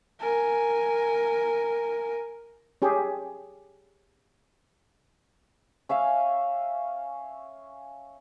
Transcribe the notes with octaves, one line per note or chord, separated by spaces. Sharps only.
A#4 G#5
C#4 G4 G#4
C#4 E5 F5 G#5